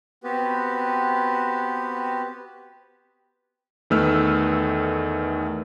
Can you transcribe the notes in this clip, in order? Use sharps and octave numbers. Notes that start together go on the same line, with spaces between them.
B3 C4 F#4 G4 B4
E2 D#3 A3 B4 E6 F6